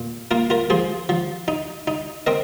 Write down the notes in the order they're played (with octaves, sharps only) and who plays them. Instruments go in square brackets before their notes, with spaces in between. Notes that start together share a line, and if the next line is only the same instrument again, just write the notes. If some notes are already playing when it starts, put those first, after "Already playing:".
Already playing: [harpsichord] A#2
A#3 F4 A#4
F4 A#4
F3 G#4 C5
F3
D#4
D#4
C4 A#4 D#5